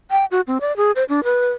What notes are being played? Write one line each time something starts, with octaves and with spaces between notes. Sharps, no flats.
G5
F#4
C4
D5
G#4
C5
D4
B4